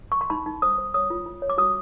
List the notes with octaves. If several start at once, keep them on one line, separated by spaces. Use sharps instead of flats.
C#6
C6
D#4 B5
D#4
C5 D#6
C5
C#5 D#6
F4
F4
C#5
D6
F#4 D#6